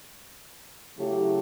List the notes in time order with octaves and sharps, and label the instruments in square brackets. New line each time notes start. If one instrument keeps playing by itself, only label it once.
[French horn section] C#3 F#3 A3 E4 G4